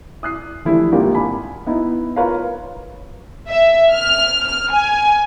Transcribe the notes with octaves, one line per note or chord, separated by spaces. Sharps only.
D#6 F#6 C7
E3 F3 G3 A3 D4 E4
G#1 D3 G3 A#3 F4 G4
G#5 B5
B3 D#4 E4
F4 A#4 B4 C#5 F5
E5
F6
F6
G#5